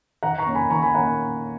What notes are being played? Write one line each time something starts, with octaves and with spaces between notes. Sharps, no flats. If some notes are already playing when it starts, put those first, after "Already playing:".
D#3 F#5 A#5
A#5 C#6
A#3 C#4
G#5 B5
D#3 A#5 C#6
G#5 B5
A#3 C#4 F#5 A#5